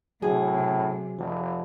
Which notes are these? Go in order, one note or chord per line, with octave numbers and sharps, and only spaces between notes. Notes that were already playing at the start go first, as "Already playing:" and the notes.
A2 C3 F#3 G#4
F1 F3